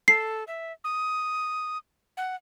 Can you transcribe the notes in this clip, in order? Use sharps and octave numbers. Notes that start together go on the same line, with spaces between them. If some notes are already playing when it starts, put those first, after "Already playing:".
A4 C7
E5
D#6
F#5